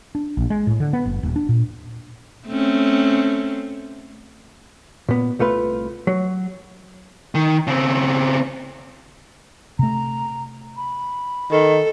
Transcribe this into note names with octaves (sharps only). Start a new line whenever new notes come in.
D4
A#1
G#3
A2
D3
B3
F#1
D#1
D4
A#2
A3 C4 C#4
A#2 B3
C2 A3 F4 B4
F#3
D#3
C#3 C4
C3 A3 A#5
B5
D#3 A4